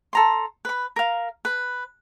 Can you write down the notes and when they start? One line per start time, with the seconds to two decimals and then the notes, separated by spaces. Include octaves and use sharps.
0.13 A4 A#5 C6
0.65 B4 B5
0.96 A#4 F5
1.45 B4